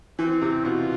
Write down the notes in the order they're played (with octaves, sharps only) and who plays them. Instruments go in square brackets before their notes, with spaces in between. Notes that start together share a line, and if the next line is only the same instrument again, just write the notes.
[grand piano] E3 [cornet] C4
[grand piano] C3
[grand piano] B2 [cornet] F4